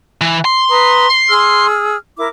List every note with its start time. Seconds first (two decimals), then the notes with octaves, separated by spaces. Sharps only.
0.21 E3
0.45 C6
0.71 B4 A#5 D#6
1.29 G#4 E6 F6
2.17 E4 A#4 D6